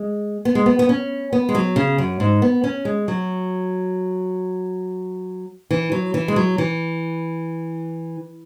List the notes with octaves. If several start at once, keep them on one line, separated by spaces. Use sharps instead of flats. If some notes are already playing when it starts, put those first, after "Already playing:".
Already playing: G#3
B3
G#3
B3
B3
C#4
B3
G#3
F#3
C#3
F#2
G#2
B3
C#4
G#3
F#3
E3
F#3
E3
G#3
F#3
E3